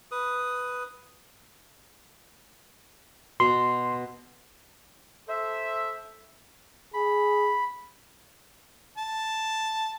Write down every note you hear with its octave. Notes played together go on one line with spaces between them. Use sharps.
B4 D#6
B2 C6
A4 C5 E5
G#4 B5
A5